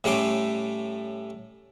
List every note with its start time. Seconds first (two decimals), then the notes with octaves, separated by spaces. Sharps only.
0.04 A2 G3 A3 C#4 C6 D6